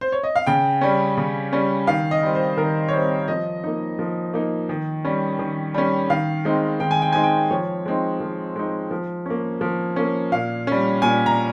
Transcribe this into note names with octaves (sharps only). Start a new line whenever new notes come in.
C5
C#5
D#5
F5
C#3 G5
G3 C#4
C#3
G3 C#4
D#3 F5
D#5
G3 C4
C5
D#3 A#4
C#5
G3 C4 C5
F3 D#5
A#3 D#4
F3
A#3 D#4
D#3
G3 C#4
D#3
G3 C#4
D#3 F5
G#3 C4 D#4
D#3 G5
G#5
G5
G#3 C4 D#4 G#5
G5
F3 C#5
G#3 C4 D#4
F3
G#3 C4 D#4
F3
A#3 C#4
F3
A#3 C#4
A#2 F5
G3 C#4
A#2 G#5
A#5